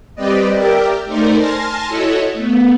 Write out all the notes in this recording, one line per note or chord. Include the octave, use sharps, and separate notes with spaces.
G3 C4 G4 B4 D5 D#5
G4 A#4 D5 E5 G5
A3 D#4 A#4 C5 D5
G#5 A5 C6 F6 A#6
E4 F#4 A4 C#5 D#5
A3 B3